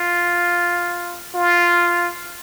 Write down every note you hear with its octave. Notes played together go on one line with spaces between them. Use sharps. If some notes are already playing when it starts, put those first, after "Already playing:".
Already playing: F4
F4